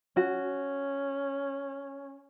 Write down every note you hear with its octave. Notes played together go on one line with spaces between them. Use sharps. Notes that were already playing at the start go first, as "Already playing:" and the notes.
C#4 F#4